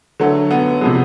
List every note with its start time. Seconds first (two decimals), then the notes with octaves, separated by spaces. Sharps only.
0.20 D3 F#3 A3
0.51 B3
0.81 C3 F3 G#3 B3